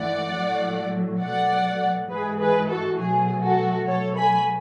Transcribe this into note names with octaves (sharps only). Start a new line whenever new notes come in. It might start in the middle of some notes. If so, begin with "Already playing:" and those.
Already playing: G#2 E3 A3 D5 F#5
A2 F#3 A3
B2 F#3 A3 D5 F#5
G#2 E3 G#3 G#4 B4
G#4 B4
F#4 A4
B2 F#3 A3 G#4
F#4 A4
B2 F#3 A3 A4 C#5
G#5 B5